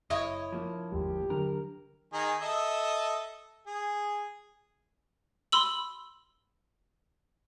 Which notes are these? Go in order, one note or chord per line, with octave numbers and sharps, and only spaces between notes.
F#1 E4 C#5 D#5
F3 A#3
G1 D#2 G#3 G4
D3 F#3 D4 A#4
D#3 D#4 G#4
A4 D#5 E5
G#4
B5 C6 E6 F#7